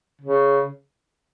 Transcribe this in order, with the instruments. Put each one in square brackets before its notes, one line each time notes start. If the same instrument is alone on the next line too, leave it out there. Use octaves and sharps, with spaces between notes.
[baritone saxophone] C#3